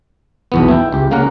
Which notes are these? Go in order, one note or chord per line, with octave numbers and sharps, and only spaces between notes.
B1 E2 B3
E4 G5
C#2 G4
C#3 A#3 C#4 A#4 F#5